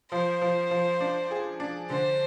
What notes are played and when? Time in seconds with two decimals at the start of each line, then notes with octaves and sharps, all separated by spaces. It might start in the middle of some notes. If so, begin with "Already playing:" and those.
0.11 F3 C5
0.42 F3
0.71 F3
1.00 D4
1.31 G#4
1.60 D4
1.90 D3 C5